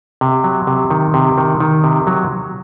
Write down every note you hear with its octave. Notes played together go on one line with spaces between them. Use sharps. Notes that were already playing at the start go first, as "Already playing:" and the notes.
C3
F#3
C3
D#3
C3
D#3
D#3
C3
F#3